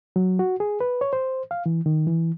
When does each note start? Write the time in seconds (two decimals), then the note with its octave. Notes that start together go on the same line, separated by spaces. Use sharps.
0.16 F#3
0.39 F#4
0.60 G#4
0.81 B4
1.01 C#5
1.13 C5
1.51 F5
1.66 E3
1.86 D#3
2.07 E3